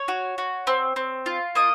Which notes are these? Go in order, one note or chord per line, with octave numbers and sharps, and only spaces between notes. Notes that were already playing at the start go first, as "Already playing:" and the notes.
Already playing: C#5
F#4
F#4
C4
C4
F4
A#3 D#5 D#6